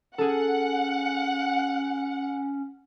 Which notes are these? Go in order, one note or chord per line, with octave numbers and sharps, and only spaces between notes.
C#4 G#4 A4 F#5